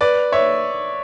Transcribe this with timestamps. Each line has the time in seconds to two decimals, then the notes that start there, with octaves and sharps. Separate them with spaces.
0.01 B4 D5
0.32 C#5 E5